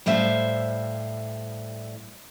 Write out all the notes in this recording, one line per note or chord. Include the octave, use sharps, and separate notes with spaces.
A2 G3 C5 E5 F5